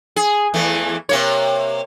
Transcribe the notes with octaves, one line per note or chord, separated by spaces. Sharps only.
G#4
E2 E3 A3
C3 A#3 C#5